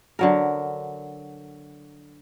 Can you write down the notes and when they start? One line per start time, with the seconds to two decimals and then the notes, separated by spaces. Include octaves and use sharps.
0.19 D3 F#3 A#4